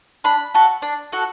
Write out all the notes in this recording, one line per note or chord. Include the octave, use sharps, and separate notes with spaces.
D4 B5
F#4 A4
D4
F#4 A4